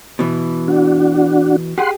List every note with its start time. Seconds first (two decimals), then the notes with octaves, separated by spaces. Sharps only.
0.19 B2 E3
0.68 D4 F#4
1.78 G4 G#4 F#5 C6